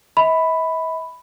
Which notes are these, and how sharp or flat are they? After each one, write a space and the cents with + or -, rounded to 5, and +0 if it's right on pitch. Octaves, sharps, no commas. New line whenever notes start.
E5 -45 B5 +5